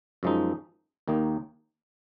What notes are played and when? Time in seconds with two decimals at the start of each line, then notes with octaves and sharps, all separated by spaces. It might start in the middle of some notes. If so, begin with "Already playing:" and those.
0.23 F#2 F3 G#3 D#4
1.08 D#2 D#3 A#3 D#4